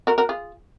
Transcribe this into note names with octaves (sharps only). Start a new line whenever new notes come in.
F#4 A#4
F#4 A#4
F4 G#4